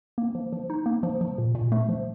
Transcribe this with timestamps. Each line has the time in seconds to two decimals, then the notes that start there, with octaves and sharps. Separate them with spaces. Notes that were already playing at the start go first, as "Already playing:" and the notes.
0.18 A#3
0.35 F3
0.52 F3
0.70 D#4
0.86 A#3
1.03 F3
1.21 F3
1.38 A#2
1.55 A#2
1.72 A3
1.89 F3